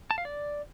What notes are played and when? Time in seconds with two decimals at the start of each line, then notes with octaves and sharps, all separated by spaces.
0.11 A5
0.18 F5
0.25 D5